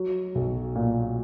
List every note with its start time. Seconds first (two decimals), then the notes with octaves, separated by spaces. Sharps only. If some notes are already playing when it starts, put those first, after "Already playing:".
Already playing: F#3
0.35 B1
0.75 A#2